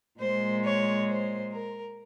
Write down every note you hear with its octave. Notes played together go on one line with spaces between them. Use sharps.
A#2 G#3 C5
C#5
C5
A#4